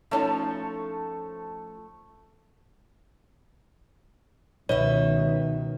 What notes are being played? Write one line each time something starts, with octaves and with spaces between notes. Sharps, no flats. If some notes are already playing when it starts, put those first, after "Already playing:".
F3 A3 C#4 D#4 A5
C#2 B2 D#3 D#4 B4 C#5 E5